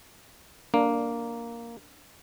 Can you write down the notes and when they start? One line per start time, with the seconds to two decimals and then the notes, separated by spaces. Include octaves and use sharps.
0.74 A#3 D4